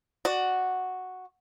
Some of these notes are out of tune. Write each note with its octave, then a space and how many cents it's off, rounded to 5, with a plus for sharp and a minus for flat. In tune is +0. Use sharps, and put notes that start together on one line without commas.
F#4 +0 D5 +15